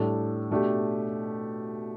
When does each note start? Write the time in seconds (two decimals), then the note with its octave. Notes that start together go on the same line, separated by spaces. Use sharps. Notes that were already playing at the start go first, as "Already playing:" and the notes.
Already playing: A2 G3 D4 A4
0.51 B2 A3 D4 G4